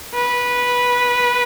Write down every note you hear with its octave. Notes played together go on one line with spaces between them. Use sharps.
B4